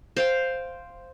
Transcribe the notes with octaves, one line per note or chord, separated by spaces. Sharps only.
C5 F5 G5